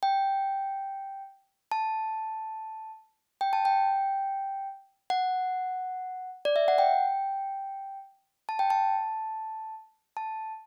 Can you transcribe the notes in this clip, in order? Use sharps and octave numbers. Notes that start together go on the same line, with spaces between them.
G5
A5
G5
A5
G5
F#5
D5
E5
F#5
G5
A5
G5
A5
A5